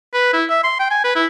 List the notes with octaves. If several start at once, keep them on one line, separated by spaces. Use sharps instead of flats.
B4
E4
E5
C6
G5
G#5
B4
E4